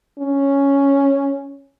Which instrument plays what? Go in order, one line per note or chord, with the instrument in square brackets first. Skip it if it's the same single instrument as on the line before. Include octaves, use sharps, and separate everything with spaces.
[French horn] C#4